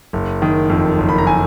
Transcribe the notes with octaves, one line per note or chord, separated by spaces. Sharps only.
F#1
D#3
F2
F#1
B5
A#5
G#5